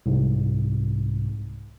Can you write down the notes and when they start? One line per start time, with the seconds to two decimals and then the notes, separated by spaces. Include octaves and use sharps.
0.06 C2 G#2